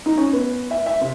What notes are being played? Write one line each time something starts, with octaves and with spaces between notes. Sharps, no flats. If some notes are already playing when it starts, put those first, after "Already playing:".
D#4
C#4
B3
E5
E5
C3